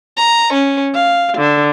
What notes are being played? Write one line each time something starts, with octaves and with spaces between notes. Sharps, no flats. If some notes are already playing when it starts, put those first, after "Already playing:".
A#5
C#4
F5
D3